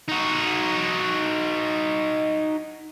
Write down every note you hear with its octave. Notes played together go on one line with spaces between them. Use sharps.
D#4 F#4